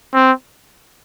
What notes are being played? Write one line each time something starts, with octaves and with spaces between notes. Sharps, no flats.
C4